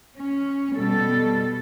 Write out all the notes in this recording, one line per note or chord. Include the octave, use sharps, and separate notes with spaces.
C#4
B2 G3 A4